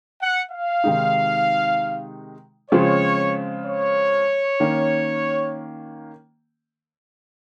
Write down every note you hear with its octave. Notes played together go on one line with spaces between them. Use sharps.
F#5
F5
C3 D#3 G#3 D#4
C#3 F3 G#3 C4 F4 C#5
C#5
D#3 A#3 C#4